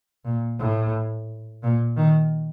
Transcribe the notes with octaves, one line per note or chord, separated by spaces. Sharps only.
A#2
A2
A#2
D#3